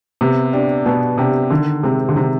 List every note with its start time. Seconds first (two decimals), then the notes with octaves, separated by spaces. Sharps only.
0.21 C3 B3
0.53 D4 G4
0.86 B2 B3
1.18 C3 D4 G4
1.51 D3 D#3
1.83 C3 G#3 C4
2.09 D3
2.16 C3 D#3